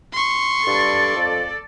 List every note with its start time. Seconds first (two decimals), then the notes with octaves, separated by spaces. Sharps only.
0.13 C6 C#6
0.67 G2 A4 D5
1.16 F2